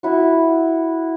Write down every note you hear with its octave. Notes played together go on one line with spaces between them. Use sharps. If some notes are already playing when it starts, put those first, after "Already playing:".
E4 F#4